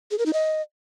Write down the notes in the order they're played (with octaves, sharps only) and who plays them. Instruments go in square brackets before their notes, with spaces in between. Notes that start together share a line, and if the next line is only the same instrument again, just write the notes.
[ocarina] G#4
A#4
D#4
D#5